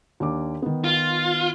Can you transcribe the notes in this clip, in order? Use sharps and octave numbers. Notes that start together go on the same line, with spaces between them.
D#2 D4 D6
D#3 B3
F4